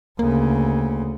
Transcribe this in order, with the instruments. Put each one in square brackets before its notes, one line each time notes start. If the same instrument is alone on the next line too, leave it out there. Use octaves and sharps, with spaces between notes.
[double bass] D2 C#3 [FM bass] A#3